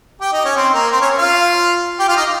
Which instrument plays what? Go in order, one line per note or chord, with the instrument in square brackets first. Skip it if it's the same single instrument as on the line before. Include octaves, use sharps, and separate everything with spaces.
[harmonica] G4 G5
D#4 D#5
C#4 C#5
C4 C5
A#3 A#4
C4 C5
C#4 C#5
F4 F5
G4 G5
F4 F5
D#4 D#5